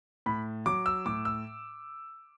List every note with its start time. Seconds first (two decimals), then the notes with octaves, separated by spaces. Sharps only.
0.26 A2 B5
0.66 F#3 D6
0.86 E6
1.06 A2 D6
1.25 E6